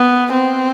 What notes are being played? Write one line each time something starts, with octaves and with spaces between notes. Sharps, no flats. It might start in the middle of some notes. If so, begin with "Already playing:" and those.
Already playing: B3
C4